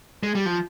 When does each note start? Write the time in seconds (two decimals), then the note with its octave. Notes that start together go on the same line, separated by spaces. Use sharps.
0.23 G#3
0.35 G3
0.46 F3